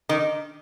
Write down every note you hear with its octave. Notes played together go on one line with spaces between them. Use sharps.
D#3